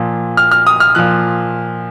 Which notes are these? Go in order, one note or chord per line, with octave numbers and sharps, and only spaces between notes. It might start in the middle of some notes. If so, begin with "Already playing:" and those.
Already playing: A#2 F3
F6
F6
D#6
F6
A#2 F3 F#6